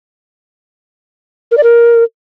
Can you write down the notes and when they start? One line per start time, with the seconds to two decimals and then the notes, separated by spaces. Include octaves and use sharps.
1.51 A#4
1.57 D5
1.63 A#4